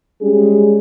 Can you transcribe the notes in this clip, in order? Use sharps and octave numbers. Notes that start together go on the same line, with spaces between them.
G3 G#3 C#4 G4 G#4